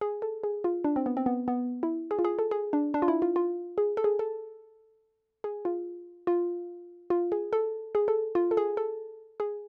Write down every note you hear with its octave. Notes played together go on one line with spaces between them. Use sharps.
G#4
A4
G#4
F4
D4
C4
B3
C4
B3
B3
E4
G#4
F4
G#4
A4
G#4
D4
D4
F4
E4
F4
F4
G#4
A4
G#4
A4
G#4
F4
F4
F4
G#4
A4
G#4
A4
F4
A4
G#4
A4
G#4